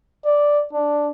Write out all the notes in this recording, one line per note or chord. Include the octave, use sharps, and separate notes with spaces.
D5
D4